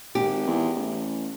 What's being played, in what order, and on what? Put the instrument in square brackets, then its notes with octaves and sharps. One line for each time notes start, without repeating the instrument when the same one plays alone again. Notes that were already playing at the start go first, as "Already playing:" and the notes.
[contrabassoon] G#1 [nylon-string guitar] G4
[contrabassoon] E2
A1